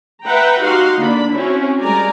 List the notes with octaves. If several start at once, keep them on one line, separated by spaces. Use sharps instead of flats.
B4 E5 F#5 G5 A#5
D#4 F#4 G4 F5 F#5 C6
D3 A#3 D4 B5
C4 C#4 E4 F#4 C#5
G3 G#3 A#4 D5 G#5 A#5